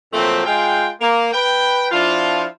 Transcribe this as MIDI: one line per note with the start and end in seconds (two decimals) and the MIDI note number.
0.13 0.44 46
0.13 0.44 53
0.13 0.44 54
0.13 0.44 57
0.13 0.44 60
0.45 0.87 56
0.45 0.87 65
0.45 0.87 79
1.01 1.32 58
1.33 1.86 71
1.33 1.86 79
1.91 2.44 53
1.91 2.44 62
1.91 2.44 64
1.91 2.44 65